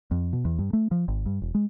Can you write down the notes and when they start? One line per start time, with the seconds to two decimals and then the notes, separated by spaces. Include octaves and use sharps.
0.11 F2
0.33 B2
0.45 E2
0.59 G2
0.73 A3
0.91 F3
1.08 G#1
1.26 G2
1.42 E1
1.54 G#3